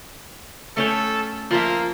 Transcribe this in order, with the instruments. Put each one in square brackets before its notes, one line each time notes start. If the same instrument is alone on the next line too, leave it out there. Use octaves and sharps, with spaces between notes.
[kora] A3 C#4 G5 [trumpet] A4
[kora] F3 F4 E5 [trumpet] A#3